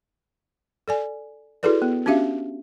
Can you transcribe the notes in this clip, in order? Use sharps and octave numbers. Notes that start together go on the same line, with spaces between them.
A4 D5 G#5
E4 F#4 G#4 A4 B4 D5
B3
C#4 D4 F#4 G4 E5 F5